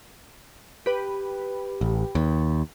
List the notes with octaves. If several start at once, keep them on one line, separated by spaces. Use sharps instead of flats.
G4 B4
A1
D#2